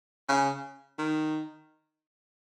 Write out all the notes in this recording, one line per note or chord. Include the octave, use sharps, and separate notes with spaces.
C#3
D#3